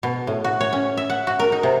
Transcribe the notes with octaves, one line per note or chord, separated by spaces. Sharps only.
B2
A2
F#4
C#5
C#4
E5
F#5
F#4
A#4
D#4
C3